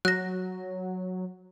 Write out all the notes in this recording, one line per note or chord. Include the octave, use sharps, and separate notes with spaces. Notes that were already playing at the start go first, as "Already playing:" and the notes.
F#3 F#6 A#6